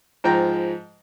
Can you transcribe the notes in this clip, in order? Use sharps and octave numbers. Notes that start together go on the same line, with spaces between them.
G#2 F3 G5 A#5